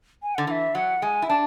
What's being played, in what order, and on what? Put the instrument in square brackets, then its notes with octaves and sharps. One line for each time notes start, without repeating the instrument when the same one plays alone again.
[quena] G#5
[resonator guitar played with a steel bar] D3 [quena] F#5
[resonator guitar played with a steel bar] E3 [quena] F#5
[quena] E5
[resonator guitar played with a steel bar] F#3 [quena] F#5
[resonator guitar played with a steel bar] G#3 [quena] G#5
[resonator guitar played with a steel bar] E4
[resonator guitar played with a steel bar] D4 [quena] A5